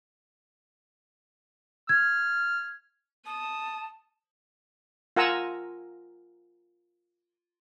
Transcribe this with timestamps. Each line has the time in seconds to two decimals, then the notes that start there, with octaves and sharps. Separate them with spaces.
1.89 F6 G#6
3.26 A5 D#6
5.16 F4 A#4 F#5 G#5 A#5 E6